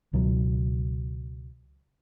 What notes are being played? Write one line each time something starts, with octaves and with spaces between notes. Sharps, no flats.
C#2 B2 D#3 F#3